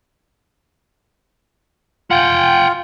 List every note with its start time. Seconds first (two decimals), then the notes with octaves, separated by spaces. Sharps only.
2.11 F4 F#5 G5